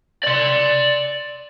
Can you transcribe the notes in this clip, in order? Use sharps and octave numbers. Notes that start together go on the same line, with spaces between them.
D5 C6